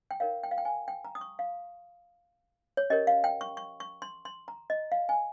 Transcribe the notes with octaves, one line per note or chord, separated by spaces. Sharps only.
G5
D#4 A#4 C#5 F5
G5
F5
G5
G#5
G5
A#5
D#6
C#6
F5
C#5
C#4 G4 A#4 C#5 D#5
F5
G5
C#6
C#6
C#6
C6
C6
A#5
D#5
F5
G#5